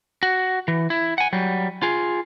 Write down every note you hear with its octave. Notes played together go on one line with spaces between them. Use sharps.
F#4
E3
E4
F#5 G#5
F#3 G3
F4 G#4